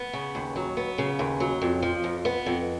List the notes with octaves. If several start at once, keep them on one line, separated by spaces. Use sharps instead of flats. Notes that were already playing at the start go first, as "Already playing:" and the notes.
Already playing: B3
C#3
D#2
F#3
B3
C#3
D#2
F#3
F2
F3
F2
B3
F2